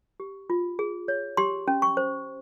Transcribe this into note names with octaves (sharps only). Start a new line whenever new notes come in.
G4
F4
G#4
C#5
G4 C6
C#4
C#6
C5